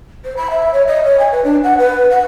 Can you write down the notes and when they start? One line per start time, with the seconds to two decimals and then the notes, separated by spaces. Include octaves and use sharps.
0.24 C5
0.37 B5
0.51 E5
0.73 C#5
0.88 D#5
1.04 C#5
1.19 G#5
1.32 B4
1.44 D4
1.64 F#5
1.78 B4
2.10 F#5